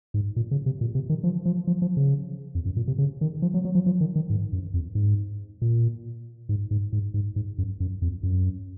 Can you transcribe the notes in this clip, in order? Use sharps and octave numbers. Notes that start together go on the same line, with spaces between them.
G#2
A#2
C#3
C3
A#2
C3
D#3
F3
F3
F3
F3
C#3
F2
F#2
A#2
C3
C#3
D#3
F3
F#3
F#3
F3
F3
D#3
D#3
G#2
F#2
F2
G#2
A#2
G#2
G#2
G#2
G#2
G#2
F#2
F#2
F2
F#2